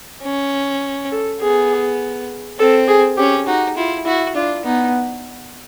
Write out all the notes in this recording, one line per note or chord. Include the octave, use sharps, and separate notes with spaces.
C#4
A4
B3 G#4
C4 A4
G#4
C#4 G4
D#4 F#4
E4 F4
E4 F#4
D4 F4
B3 D#4